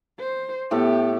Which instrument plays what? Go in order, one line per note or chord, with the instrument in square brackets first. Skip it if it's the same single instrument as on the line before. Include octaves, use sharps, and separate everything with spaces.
[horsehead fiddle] C5
[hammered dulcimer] A2 A4 [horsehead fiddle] B3 G4